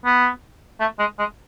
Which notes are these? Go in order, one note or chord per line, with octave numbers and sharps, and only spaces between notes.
B3
A3
G#3
G#3